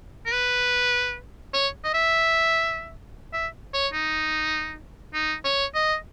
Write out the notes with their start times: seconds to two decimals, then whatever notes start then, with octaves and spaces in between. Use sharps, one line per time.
0.26 A#4
0.32 B4
1.54 C#5
1.84 D#5
1.94 E5
3.33 E5
3.74 C#5
3.93 D#4
5.14 D#4
5.45 C#5
5.74 D#5